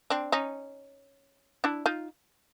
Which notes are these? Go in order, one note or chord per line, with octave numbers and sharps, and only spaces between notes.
C4 D4
C#4 D#4
D4 E4
D#4 F4